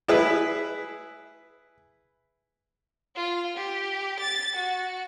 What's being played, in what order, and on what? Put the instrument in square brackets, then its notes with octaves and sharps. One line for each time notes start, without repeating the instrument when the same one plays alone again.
[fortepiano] E4 G#4 B4
[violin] F4
G4
A6
F#4